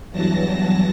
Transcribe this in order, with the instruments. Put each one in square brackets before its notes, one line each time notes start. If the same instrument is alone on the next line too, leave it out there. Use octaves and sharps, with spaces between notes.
[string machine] E2 G2 E3 F#3 A5 A#6